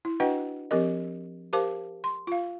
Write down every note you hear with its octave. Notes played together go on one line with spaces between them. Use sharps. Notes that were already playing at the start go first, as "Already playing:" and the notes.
E4
D4 F#4 B4 D#5 F#5 G5
F3 C4 G4 A#4 D#5
G4 A#4 C5 F5 A5 D6
C6
F4 F5